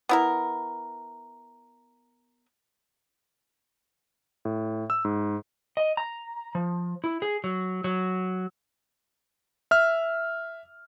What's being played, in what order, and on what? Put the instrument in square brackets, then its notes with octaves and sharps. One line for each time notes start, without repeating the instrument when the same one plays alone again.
[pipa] B3 E4 A#4
[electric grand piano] A2
E6
G#2
[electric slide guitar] D#5
A#5
F3
E4
G#4
F#3
F#3
[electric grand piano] E5 F6